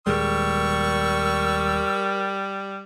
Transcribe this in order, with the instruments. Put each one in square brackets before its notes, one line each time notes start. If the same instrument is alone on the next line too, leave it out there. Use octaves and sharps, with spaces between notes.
[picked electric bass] D#1 G#3 [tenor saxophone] G3 [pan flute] A#4 [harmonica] C#6 E6